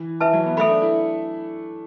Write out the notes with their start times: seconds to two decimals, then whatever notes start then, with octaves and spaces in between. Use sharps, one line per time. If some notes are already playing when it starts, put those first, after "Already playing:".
Already playing: E3
0.20 E3 B4 E5 A5
0.33 F#3
0.46 B3
0.57 A3 A4 E5 B5
0.69 D4
0.82 E4